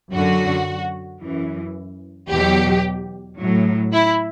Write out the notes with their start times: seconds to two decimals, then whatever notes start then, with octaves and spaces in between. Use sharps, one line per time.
0.13 F#2 D3 F#3 F#4
1.22 F#2 E3
2.29 E2 B2 F#3 G4
3.38 A2 F#3
3.92 E4